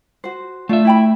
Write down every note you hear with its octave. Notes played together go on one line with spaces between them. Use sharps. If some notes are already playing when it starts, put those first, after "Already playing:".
F#4 C5
A3 D4 F4 E5
E4 G5 B5